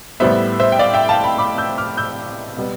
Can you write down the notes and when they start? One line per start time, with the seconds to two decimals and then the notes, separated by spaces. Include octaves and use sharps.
0.20 A2 G3 B3 C5 E5
0.60 C5 E5
0.72 G5
0.79 D5 F5
0.94 E5 G5
1.09 F5 A5
1.24 G5 B5
1.38 B5 D6
1.58 E6 G6
1.78 D6 F6
1.97 E6 G6
2.57 B2 G3 B3